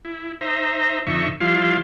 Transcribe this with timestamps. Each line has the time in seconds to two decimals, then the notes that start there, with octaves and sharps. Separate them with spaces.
0.05 E4
0.41 D#4 C5 E5 A#5
1.07 F2 D3 D#4 E5 C#6
1.41 F3 G3 E4 F5 C6